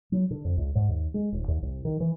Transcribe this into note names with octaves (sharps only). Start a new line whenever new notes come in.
F#3
D3
F2
C#2
G#2
D#2
G#3
D#1
D#2
C2
D#3
E3